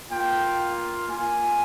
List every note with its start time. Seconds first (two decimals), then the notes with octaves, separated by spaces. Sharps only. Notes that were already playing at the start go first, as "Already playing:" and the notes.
0.11 A#3 F4 G5
1.08 A#3 F4 G#5